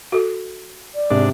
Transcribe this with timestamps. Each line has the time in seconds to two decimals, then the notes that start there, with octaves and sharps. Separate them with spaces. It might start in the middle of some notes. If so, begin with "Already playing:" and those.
0.12 F#4 A4
0.95 D5
1.10 G#2 C3 C4 D4